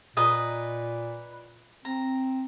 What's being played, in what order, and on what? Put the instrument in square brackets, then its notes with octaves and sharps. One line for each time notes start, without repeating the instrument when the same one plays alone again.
[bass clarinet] A#2 [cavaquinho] B4 D#5 A#5
[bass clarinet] C4 [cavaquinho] A#5